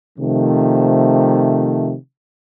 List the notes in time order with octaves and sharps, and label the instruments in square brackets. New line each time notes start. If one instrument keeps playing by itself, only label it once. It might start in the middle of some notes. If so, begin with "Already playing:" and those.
[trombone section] C3 D#3 F3 A3